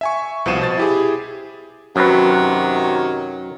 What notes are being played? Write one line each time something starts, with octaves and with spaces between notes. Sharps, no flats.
E5 G#5 C#6
C2 B2 F3 F4 D#7 E7
B2 C5 A6
E4 G4 G#4
F#2 C3 D#3 F#3 B4